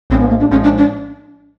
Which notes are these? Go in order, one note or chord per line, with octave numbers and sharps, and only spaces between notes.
A#1 A2 F3 G#3 C4
B3
A#3
D4
A#1 A2 F3 G#3 C#4
D4
D4